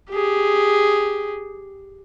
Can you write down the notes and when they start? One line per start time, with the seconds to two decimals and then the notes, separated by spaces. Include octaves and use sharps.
0.11 G4 G#4